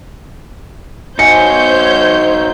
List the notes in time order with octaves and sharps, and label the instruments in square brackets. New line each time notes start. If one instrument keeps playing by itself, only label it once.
[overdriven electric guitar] D#4 F#4 [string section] C5 C#5 G6 [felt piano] G#5 C#7